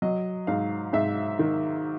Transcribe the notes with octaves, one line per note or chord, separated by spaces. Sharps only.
F#3 D#5
G#2 F5
G#2 E5
D#3